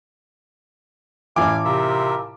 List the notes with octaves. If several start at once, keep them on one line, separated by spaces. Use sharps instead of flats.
A1 E3 F5 G#5 D6
C3 F4 A#4 E5